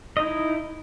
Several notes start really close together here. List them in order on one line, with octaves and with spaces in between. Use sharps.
D#5 D#4 E4